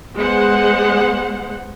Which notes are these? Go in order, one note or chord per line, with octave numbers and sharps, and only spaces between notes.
G#3 B3 C5 F#5